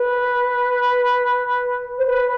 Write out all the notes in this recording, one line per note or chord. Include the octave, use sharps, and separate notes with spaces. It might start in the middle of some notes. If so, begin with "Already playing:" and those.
Already playing: B4
C5
B4